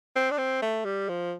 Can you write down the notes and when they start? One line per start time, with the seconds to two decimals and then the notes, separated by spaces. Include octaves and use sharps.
0.16 C4
0.31 D4
0.38 C4
0.62 A3
0.85 G3
1.09 F3